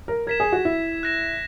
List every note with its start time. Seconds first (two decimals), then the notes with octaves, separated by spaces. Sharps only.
0.08 A#4
0.27 A#4 G#6 B6 E7
0.40 G#4
0.52 F#4
0.65 E4
1.03 F#6 A#6 E7